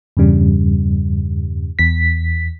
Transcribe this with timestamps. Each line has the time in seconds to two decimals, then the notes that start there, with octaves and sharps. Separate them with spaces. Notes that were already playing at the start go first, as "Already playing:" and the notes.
0.17 E2 G2 C#3 G3
1.79 E2 B6